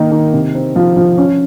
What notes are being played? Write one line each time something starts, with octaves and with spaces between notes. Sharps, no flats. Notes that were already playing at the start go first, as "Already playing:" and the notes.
Already playing: D#3 A#3 D#4
D#3
C3
C4
F3
F3
C#4